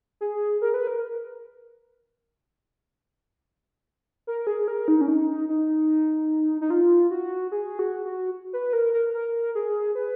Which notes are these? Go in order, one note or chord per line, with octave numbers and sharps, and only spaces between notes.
G#4
A#4
B4
A#4
A#4
G#4
A#4
D#4
C#4
D#4
D#4
D#4
F4
F#4
G#4
F#4
F#4
B4
A#4
A#4
A#4
G#4
B4